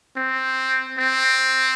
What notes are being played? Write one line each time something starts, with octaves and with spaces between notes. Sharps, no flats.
C4
C4